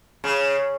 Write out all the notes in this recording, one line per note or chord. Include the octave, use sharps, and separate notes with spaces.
C#3